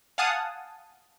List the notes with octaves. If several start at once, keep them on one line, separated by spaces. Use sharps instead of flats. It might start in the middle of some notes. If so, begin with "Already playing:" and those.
F5 F#5 G#5 A5 D#6